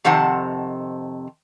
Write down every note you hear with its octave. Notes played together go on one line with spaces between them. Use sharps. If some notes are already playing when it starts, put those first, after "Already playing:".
F2 C3 D#3 C4 F#5 A5